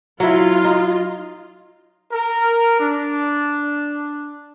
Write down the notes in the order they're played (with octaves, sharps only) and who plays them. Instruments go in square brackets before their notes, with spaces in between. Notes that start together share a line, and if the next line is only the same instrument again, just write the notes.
[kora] F#3 E4 [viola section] F4
[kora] D#4
[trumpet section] A#4
D4